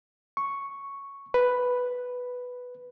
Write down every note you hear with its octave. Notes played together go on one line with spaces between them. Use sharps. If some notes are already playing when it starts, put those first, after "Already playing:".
C#6
B4